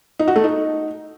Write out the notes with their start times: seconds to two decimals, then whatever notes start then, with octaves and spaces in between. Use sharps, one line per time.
0.19 D#4
0.28 F#4
0.36 A3
0.44 D#4